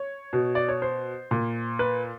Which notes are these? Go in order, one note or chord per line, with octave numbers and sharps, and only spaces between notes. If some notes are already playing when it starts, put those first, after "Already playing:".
Already playing: C#5
B2
D5
C#5
C5
A#2
B4